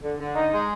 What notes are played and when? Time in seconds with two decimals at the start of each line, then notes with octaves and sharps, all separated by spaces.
0.02 D3
0.19 D3
0.35 D#4
0.52 G#3